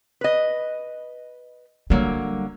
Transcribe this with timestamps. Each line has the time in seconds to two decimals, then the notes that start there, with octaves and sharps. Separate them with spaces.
0.21 B4 D#5
1.90 D3 F#3 G3 A#3